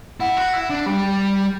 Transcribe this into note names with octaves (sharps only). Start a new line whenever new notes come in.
E4 F#5
F#4
E4
D4
G3